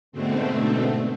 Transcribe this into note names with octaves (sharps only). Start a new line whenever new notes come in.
G#2 B2 D3 A3 C4